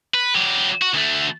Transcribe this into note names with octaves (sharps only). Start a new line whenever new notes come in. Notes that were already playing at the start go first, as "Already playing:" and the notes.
B4
F#3 G4
F#4
D2 A3